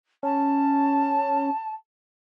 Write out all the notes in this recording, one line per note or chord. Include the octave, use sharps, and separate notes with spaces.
C#4 A5